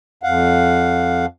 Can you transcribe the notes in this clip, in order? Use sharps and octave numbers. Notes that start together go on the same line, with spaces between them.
F2 F5 F#5